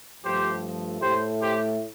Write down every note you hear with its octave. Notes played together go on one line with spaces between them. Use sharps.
G2 F3 A3 G4 C5
A2 A3 G4 C5
G4 C5